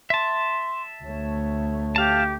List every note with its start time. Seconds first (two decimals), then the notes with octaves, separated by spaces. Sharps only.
0.10 E5 A5 C6
1.04 D2 A3 C#5
1.96 G4 F5 A5